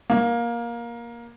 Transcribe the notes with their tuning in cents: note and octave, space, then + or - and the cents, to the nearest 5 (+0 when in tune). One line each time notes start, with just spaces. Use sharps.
A#3 +15